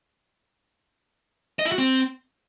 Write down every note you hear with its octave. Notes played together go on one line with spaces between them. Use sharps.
D#5
E4
F#4
C4